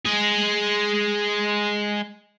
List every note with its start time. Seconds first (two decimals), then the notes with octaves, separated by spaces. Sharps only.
0.06 G#3 G#4